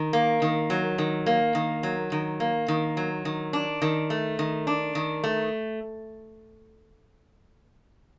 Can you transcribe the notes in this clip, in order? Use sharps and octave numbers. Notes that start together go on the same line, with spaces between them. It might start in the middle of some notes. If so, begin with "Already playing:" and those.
Already playing: D#3
A#3
D#3
F#3
D#3
A#3
D#3
F#3
D#3
A#3
D#3
F#3
D#3
D4
D#3
A3
D#3
D4
D#3
A3